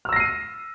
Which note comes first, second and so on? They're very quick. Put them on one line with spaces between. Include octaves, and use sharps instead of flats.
F6 E6 A#6 C7 D#7